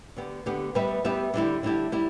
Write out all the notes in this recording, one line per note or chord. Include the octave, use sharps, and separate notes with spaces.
D3 B3 G4
D3 B3 G4
G3 B3 G4 B4 E5
G3 B3 G4 B4 E5
D3 G3 E4 G4
D3 G3 E4 G4
G3 E4 G4